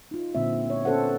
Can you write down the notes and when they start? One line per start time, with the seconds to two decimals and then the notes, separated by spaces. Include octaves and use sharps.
0.11 D#4 F4
0.35 A#2 D3 G#3 C4 E5
0.66 B3 C#5
0.85 B3 C#4 A4 C5 F#5